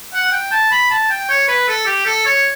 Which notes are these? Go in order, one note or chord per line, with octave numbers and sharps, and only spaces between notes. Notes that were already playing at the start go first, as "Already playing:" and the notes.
F#5
G5
A5
B5
A5
G5
C#5
B4
A4
G4
A4
C#5